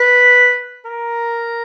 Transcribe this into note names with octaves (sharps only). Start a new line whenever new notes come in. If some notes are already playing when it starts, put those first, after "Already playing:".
Already playing: B4
A#4